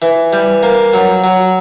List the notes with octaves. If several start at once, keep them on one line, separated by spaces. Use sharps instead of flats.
E3
G3
A#3
F#3
F#3